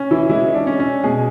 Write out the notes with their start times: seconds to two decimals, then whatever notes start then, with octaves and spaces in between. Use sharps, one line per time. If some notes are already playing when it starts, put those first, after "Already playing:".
Already playing: C#4
0.11 E3 E4
0.29 E3 G#3 E4
0.54 D4
0.67 C#4
0.80 C#4
1.03 B2 G#3 G#4